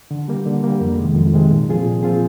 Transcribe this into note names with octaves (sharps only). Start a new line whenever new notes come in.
D3
G3 A#3
D3
G3 A#3
F2
C3 D#3 G#3
F2
C3 D#3 G#3
A#2
F3 C4 F4 G#4
A#2
F3 C4 F4 G#4